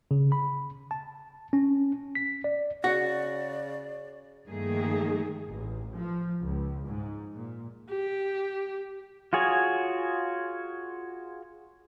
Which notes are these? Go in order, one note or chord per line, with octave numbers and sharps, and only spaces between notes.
C#3
B5
A5
C#4
B6
D5
C#3 F#4 D5 F#5
G2 D#3 F3 A3 A#3 G#4
A1
F3
C#2
G#2
A#2
G4
F4 F#4 G#4 C#5